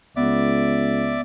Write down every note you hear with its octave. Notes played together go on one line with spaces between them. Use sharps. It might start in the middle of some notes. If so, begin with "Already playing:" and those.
C#2 B3 D5 E5 D6